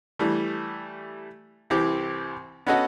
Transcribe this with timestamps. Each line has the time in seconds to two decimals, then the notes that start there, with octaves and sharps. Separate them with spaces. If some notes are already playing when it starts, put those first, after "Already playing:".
0.19 E3 G3 A3
1.70 C2 E3 C4 G4 D6
2.67 B3 C#4 F#4 A4 D#5 F#5